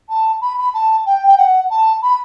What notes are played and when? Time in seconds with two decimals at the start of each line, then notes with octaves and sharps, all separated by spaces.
0.09 A5
0.41 B5
0.58 B5
0.74 A5
1.06 G5
1.27 G5
1.37 F#5
1.70 A5
2.02 B5